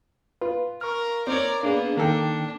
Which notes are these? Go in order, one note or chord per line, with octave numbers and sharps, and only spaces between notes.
F4 B4
A#4 C#6 F6
C4 A#4 C#5 D5
A#3 B3 D4 G#4
D#3 A#3 D4 A4 G5